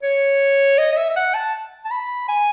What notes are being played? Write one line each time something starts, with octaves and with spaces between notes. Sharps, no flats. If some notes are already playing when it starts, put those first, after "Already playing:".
C#5
D#5
D#5
E5
E5
F#5
A5
A5
B5
G#5